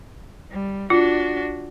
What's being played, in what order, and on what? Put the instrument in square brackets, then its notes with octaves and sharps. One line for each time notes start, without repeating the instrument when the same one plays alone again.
[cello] G3
[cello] D4 F#4 [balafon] F4